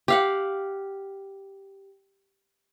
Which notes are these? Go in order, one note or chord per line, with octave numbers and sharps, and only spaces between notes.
G4 F5 F#5